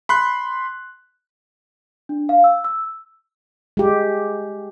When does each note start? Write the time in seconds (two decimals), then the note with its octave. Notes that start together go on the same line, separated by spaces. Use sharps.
0.09 B5 C6 F#6
2.09 D4
2.29 F5
2.44 E6
2.65 E6
3.77 G#3 G4